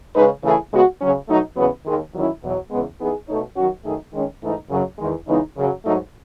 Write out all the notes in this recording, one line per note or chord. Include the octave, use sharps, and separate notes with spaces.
C#3 G#3 D#4 G#4 B4
C#3 E3 A3 E4 G#4
C#3 G#3 B3 F#4
C#3 F#3 C#4
B2 F#3 A3 D#4
E2 C#3 F#3 B3
D#2 D#3 G#3
E2 D#3 F#3 C#4 E4
E2 B2 F#3
E2 C#3 G#3 B3
E3 B3 D#4 G#4
B2 A3 D#4 A4 C#5
D#3 F#3 C#4 F#4
F#2 D#3 A3 D#4 G#4
D#3 G#3 C#4
G#2 E3 A3 D#4
F#2 C#3 F#3
E2 D#3 G#3
C#3 E3 G#3 B3 D#4
F#2 C#3 F#3
G#2 F#3 A3 D#4